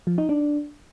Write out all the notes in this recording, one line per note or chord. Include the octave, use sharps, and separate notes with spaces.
F3
D#4
D4